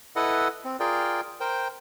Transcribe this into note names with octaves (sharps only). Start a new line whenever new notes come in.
E4 A4 B4 D#5 F#5
C4
F4 G#4 A#4 D5 G5
A#4 C5 G5